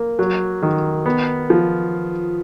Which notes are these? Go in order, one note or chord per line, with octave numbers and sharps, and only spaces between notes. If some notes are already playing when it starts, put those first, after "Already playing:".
Already playing: A#3
F#3
D#3
B3
F3